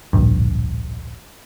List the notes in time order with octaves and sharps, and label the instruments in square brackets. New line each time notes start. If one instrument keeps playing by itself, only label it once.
[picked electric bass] D1 A#1 G2